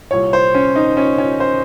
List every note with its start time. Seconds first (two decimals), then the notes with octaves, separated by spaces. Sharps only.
0.11 C2 A#2 C#5
0.33 C5
0.55 C#4
0.76 D#4
0.97 C#4
1.18 C#4
1.40 C5